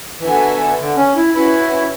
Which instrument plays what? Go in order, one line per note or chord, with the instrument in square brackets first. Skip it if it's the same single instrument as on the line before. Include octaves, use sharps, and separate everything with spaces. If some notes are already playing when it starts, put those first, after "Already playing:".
[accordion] E3
[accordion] D3 [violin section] B3 F#4 A4 E5 G#5
[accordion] D3
C#4
E4
[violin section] C#4 F#4 B4 [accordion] E4